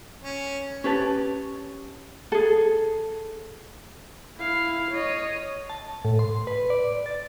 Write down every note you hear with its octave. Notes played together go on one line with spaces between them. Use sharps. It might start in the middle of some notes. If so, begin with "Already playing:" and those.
C#4
C#4 G4 B4 C#5 A5
G#4 A4
E4 F5
C#5 D#5
A5
A2
C6
B4
D5
A6